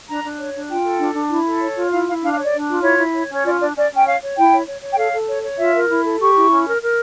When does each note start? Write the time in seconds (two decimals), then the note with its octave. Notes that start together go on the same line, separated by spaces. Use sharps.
0.08 D4 A#5
0.23 D4
0.38 C#5
0.54 D4
0.69 F4 G5
0.84 A4
1.00 D4
1.15 D4
1.31 E4
1.46 A4
1.61 C#5
1.76 F4
1.91 E4 F5
2.07 E4 F5
2.22 D4 F5
2.32 F5
2.38 C#5
2.43 D5
2.53 D4
2.68 F4
2.83 E4 C#5
2.98 E4
3.13 C#5
3.29 C#4 C#5
3.44 F4 D5
3.59 D4 D5
3.76 C#4 D5
3.91 C#4 G5
4.06 C#5 F5
4.21 C#5
4.36 E4 G5
4.51 C#5
4.67 C#5
4.82 C#5
4.92 G5
4.97 A4 F5
5.13 A4
5.28 C#5
5.43 C#5
5.58 F4 E5
5.74 A#4
5.89 E4
6.04 A4
6.20 G4 C#6
6.36 E4
6.51 C#4
6.66 A#4
6.81 A#4